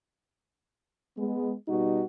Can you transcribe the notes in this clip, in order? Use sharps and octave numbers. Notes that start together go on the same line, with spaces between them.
G#3 B3
B2 G3 D#4 F#4